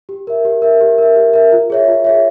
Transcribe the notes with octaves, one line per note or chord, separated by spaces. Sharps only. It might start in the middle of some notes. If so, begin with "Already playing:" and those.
G4
A#4 E5
G4
A#4 E5
G4
A#4 E5
G4
A#4 E5
F4
G#4 C#5 E5
F4
G#4 C#5 E5